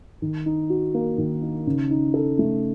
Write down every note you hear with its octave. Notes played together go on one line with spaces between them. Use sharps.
D#3
D#4
F#4
A#3
D#3
D#4
C#3
D#4
A4
A3